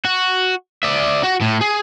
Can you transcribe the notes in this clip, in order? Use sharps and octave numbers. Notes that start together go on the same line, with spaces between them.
F#4
D5 E5
F#4
A2
G#4